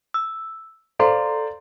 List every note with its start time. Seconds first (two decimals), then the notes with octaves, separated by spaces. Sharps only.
0.14 E6
0.99 A4 C5 D5 F5 A#5 C6